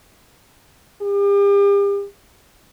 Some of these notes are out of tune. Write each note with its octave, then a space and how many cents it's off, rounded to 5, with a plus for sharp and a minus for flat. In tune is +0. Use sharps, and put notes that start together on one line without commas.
G4 +40